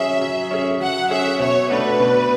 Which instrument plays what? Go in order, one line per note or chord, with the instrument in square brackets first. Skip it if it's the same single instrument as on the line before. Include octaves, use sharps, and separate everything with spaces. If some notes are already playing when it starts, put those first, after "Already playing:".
Already playing: [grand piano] F#3 C#4 G#4 [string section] E5
[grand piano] F#3
C#4 G#4
[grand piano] F#3 [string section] F#5
[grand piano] C#4 G#4 [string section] E5
[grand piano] B2 [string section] C#5
[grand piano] A3 D4 F#4 [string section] B4
[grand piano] B2